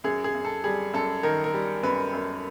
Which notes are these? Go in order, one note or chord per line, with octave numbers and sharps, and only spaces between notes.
F#2 G#4
G#4
F#2
A4
G3 G#4
F#2 A4
D#3 A#4
A#4
G3
F#2 B4
F#2